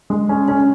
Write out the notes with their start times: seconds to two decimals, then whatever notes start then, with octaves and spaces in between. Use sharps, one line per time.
0.10 G#3
0.29 C#4
0.48 C#4